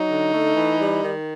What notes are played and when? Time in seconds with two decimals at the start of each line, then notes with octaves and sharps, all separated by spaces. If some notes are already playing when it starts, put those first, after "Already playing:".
Already playing: F#3 D#4
0.09 D3
0.32 A3
0.56 E3
0.78 G3
1.02 D#3